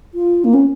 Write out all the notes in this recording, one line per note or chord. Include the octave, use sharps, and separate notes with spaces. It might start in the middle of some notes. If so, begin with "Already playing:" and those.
F4
A#3
C#4